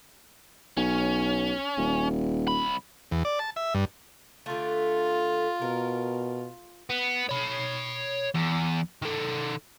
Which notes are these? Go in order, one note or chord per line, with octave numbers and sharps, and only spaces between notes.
B1 C#4
D#1
C2 B5
E2
D5
A5
E5
G2
D3 A3 F4
B2 A#4
B3
C#5 B5
E2
D#3 A4